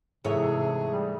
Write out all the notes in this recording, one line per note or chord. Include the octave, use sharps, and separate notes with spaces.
G#2 C3 E3 A3 G#4 C#5 E5
G3